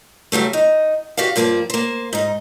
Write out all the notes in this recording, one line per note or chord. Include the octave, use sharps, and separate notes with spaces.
C#3 F#3 G3 A3
D#4
F#4 G4 D5 F5
G2 F3 A#3 A#4 D5
A#3 C5
G#2 D#4